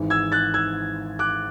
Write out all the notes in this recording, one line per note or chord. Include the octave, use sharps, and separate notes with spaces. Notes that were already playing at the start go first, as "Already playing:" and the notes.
Already playing: G#1 G#2 E3
E6 G#6
F#6 A6
E6 G#6
D6 F#6